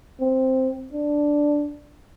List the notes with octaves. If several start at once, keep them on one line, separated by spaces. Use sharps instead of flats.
C4
D4